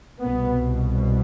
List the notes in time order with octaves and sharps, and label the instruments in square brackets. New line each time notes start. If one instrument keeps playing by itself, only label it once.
[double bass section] C2 B2 B3